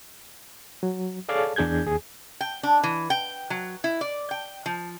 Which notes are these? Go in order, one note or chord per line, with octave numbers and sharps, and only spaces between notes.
F#3
G#4 A4 C#5 D5 F5 A5
E2 D4 G#4 G6 G#6
D#2 G#4
G5
D4
E3
G5
F#3
E4
D5
G5
F3